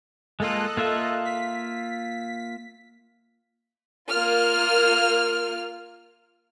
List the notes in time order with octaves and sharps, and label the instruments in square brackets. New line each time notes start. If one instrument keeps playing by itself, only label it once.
[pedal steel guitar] G#3 A#3 F4 [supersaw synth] A4 D#5 F#6
[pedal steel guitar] A#3 F4 E5
[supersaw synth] B6
[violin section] A#3 F4 F6